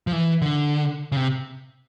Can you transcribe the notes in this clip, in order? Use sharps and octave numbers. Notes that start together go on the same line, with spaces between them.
F3
E3
D3
C#3
C3